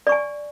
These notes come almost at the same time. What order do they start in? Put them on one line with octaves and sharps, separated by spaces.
D5 C#6 G#5